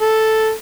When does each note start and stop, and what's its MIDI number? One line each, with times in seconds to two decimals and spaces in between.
0.01 0.51 69